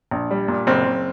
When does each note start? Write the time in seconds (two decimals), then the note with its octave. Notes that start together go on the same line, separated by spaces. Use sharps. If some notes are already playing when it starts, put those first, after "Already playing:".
0.11 A#1
0.31 G3
0.48 A#2
0.67 F#1 C4
0.86 F#1